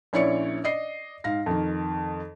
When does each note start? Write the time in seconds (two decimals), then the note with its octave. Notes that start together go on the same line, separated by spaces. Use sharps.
0.13 A#1 C#4 E4 C#5 D5 C#7
0.64 D5 D#5 C7
1.24 G#2 F5 A#6
1.46 F2 D#3